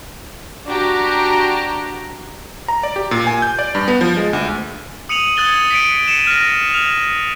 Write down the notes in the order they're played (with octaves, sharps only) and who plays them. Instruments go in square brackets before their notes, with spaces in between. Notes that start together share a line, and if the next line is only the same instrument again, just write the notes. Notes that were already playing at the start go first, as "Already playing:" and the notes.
[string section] D4 F#4 G4 A#5
[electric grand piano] A#5
D5
G4
A#2
G#5
G6
D5
G2
B3
F3
G#3
D2
[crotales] D#6 C#7 D#7 F7 F#7
D#6 F#6 G#6 A6 G7
B6 C#7 D7
C#7 D#7 E7
F6 A#6
F6 F7